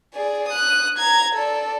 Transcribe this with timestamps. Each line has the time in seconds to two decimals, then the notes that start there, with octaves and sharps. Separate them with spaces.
0.14 G#4 D5
0.49 D#6 F#6
0.98 A#5 G#6
1.35 A4 D5